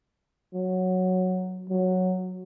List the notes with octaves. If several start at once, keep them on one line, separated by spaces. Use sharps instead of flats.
F#3
F#3